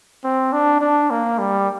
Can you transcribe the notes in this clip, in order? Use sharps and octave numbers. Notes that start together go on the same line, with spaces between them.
C4
D4
D4
A#3
G3